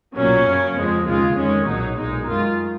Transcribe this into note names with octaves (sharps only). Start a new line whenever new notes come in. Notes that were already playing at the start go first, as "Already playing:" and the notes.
B1 A#2 F#3 C#4
F#2 C#3 F#3
F2 F3 G#3
D#2 C#3 G#3 F4
F2 D#3 G#3 C#4
B1 A#2 F#3 D#4
B1 A#2 G#3 D#4
F#2 D#3 G#3 F4